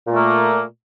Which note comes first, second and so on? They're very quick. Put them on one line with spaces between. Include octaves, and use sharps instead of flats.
A#2 A3 A#3